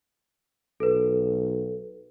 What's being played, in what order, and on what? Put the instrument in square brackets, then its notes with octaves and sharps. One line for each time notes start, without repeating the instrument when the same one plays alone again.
[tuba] B1 [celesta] A4 B4